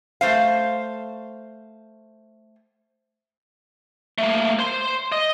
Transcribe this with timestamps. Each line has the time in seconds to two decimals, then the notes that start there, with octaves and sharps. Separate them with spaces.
0.21 A3 C5 F5
4.18 A3 A#3
4.59 C5 C6
5.12 D#5